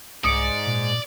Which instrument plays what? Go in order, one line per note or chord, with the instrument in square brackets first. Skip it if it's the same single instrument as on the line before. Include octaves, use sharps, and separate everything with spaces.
[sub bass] C2 [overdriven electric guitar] G#2 [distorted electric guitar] D5 [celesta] D#6 C#7 D7
[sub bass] A#2